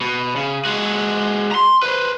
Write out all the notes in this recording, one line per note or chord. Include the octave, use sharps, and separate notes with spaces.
B2
C#3
G#3 F#4
A#5 C6
B4 C5